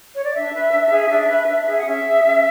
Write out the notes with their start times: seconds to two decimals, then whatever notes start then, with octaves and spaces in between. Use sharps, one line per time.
0.14 C#5
0.24 D5
0.34 D4 E5
0.53 B4
0.71 D4
0.90 G#4
1.09 D4
1.28 B4
1.47 D4
1.66 G#4
1.76 F#5
1.85 C#4 E5
2.03 G#4
2.23 C#4